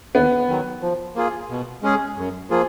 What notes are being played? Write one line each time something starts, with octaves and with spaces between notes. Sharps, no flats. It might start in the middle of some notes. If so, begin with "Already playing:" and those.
D#2 B3
D#3 F#3
F3
A#3 F4 G#4
B2
G#3 C#4 G#4
F#2
F3 A#3 F4 G#4